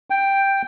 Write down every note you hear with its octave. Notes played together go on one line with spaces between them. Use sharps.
G5